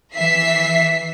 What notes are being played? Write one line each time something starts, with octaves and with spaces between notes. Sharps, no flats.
E3 E5 B6 C7